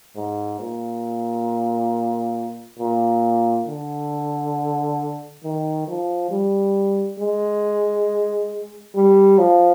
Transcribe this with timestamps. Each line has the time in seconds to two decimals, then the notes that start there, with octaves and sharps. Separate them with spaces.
0.16 G#2
0.60 A#2
2.79 A#2
3.67 D3
5.43 D#3
5.87 F3
6.31 G3
7.19 G#3
8.95 G3
9.38 F3